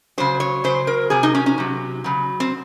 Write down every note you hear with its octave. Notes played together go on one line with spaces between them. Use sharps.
C#3 F#3 C5
C#5
C#3 F#3 C5
A#4
C3 F#3 G#4
D#4
C#4
C#4
C3 F#3
C#3 F#3
C4